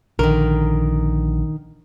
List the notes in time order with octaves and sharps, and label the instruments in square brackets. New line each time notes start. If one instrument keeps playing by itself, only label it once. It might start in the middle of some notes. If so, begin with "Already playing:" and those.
[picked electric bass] A#1 D3 [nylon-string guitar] D#3 A#4